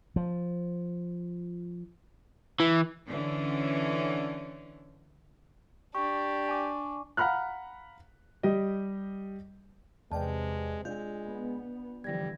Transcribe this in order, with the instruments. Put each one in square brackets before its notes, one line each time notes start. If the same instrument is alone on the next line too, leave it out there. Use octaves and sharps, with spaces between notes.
[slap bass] F3
[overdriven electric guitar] E3
[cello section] D3 E3 C#4 D4
[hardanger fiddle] D4 [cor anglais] G4 [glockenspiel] C#6
[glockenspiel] G#5 D6
[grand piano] F5 F#5 A#5 B5 F6 F#6
G3 G4 D#5
[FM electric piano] E2 D5 G5 [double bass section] C3 [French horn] G#3 [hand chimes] B4 A5
[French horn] G#3 [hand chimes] D4 D5 G6 [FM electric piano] F4
[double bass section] B3
[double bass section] D3 E3 F3 [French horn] G3 [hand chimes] G#6 A#6